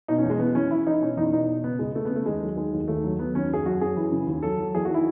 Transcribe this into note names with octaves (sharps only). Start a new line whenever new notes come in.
B2 D#4
C#4
E2
G#3
E3 B3
E3 C#4
E3 E4
E3 D#4
B2 C#4
E2 D#4
B2 D#4
B2
C#3 B3
C#2 G#3
C#3 A3
C#3 B3
A3
D#2 G#3
F#3
D#3 G#3
D#2
D#2 A3
F#3
F#3 B3
D#2 C#4
F#2 G#4
F#2 F#4
F#2 G#4
E3
C#3
D#2
F#3 A4
F#3
E2 G#4
F#4
D#3 E4